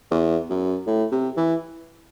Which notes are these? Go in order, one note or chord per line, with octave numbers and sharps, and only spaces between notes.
E2
F#2
A2
C3
E3